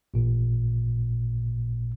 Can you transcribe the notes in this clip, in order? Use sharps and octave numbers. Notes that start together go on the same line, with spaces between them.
A1 A#2